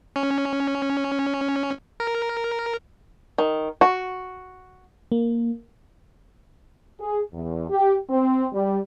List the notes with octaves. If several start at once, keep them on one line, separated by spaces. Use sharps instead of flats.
C#4
A#4
D#3
F#4
A#3
G#4
E2
G4
C4
G3